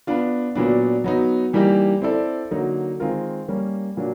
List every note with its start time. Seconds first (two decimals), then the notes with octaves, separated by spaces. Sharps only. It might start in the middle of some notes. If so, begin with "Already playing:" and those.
0.07 B3 D4 F4
0.55 A#2 F#3 B3 D4
1.04 F#3 B3 D#4
1.53 E3 G3 A#3 D#4 G4
2.02 C4 E4 A4 D5
2.51 D3 F#3 A#3 D#4
3.00 D#3 G#3 C4 F4 A#4
3.48 G3 A#3 C#4
3.97 A#2 F#3 A#3 D4